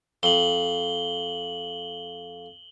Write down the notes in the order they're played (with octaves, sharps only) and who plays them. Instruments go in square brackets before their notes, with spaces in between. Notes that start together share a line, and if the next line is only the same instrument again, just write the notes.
[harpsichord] F2 [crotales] F#7 G7